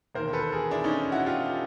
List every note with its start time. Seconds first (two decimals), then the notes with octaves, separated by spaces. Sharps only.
0.15 E1 D#2 D#3 A#4 C5
0.33 A4 B4
0.52 G#4 A#4
0.71 D4 E4
0.84 C#4 D#4
1.12 E4 F#4
1.26 F4 G4